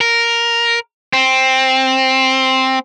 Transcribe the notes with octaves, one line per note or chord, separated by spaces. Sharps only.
A#4
C4